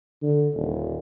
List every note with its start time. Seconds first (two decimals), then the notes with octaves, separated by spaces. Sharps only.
0.23 D3
0.54 D#1